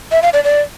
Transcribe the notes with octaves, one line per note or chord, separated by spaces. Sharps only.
E5
F5
D5
D5